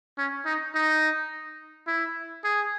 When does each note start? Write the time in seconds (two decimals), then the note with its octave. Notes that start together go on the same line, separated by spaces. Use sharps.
0.18 C#4
0.45 D#4
0.75 D#4
1.87 E4
2.44 G#4